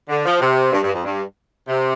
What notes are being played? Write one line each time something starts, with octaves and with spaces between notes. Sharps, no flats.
D3
F3
C3
G2
G2
F2
G2
C3